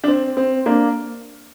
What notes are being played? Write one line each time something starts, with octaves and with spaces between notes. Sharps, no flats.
D4
C4
C4
A#3 D4